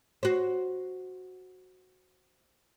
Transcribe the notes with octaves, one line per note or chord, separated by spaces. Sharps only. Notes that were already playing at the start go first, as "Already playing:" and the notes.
F#4 C5